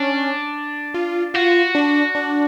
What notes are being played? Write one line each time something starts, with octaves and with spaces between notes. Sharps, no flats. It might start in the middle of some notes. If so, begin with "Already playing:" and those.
Already playing: C#4 D4
F4
F4 F#4
D4
D4